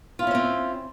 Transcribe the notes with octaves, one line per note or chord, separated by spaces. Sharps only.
C4 C#4 E4 F4 C5